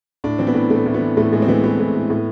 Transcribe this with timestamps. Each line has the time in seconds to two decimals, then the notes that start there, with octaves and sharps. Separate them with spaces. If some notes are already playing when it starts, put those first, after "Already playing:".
0.24 A2 D4
0.39 E3 C4
0.47 B3
0.54 A2
0.70 A2 A3
0.86 A2
0.94 B3
1.01 E3
1.17 A2 A3
1.32 A2 G#3
1.42 C4
1.48 E3 B3
1.63 A2 B3
1.79 A2
1.95 A2
2.10 A2